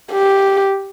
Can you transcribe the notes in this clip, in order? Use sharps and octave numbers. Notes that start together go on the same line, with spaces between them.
G4